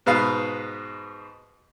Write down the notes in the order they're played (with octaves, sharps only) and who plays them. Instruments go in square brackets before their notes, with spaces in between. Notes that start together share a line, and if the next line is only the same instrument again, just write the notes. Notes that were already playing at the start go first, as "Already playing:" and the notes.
[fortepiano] G#2 B2 B4 F5